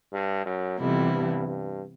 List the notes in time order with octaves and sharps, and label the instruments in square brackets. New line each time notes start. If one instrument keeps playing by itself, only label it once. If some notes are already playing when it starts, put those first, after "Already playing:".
[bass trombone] G2
F#2
[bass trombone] F2 [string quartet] C3 E3 G3 B3 E4
[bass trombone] G2
G2